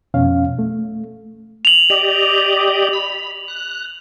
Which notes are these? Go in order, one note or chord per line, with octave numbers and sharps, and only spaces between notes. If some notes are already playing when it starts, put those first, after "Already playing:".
F2 B2 C#4 F5
A3
F7 F#7
G4 D5 D#5
B5
F#6